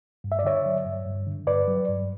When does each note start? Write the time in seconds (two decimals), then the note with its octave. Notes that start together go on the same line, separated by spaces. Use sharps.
0.24 G2
0.32 E5
0.39 D5
0.44 D3 C#5 E5
0.66 F#3
0.86 G2
1.06 G2
1.27 D3
1.47 G2 B4 D5
1.68 F#3
1.89 G2